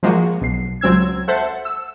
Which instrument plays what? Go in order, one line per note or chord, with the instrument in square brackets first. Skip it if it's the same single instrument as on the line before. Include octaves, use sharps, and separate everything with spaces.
[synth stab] F3 G#3 A#3 F#4
B1 C7
C#2 F#3 C4 E6 G#6
A4 C5 E5 F#5
E6